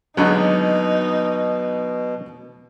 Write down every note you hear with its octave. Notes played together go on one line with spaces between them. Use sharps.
D#2 B2 D3 F#3 G#3 D#4